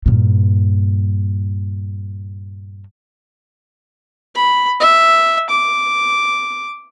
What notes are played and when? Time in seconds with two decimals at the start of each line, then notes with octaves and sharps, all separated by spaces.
0.06 G2 A#2
4.35 B5
4.80 E5
5.50 D6